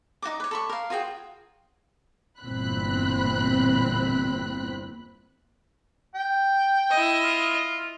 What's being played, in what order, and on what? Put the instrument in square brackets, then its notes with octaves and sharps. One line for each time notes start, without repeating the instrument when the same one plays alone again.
[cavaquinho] D#4 F#4 D5 D6
B4 C#5
A4 B5 C#6
A#4 F5
F4 F#4 G#4 G5
[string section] G1 E2 A#2 C4 B5 F#6
[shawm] G5
[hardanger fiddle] E4 D#5
[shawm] F4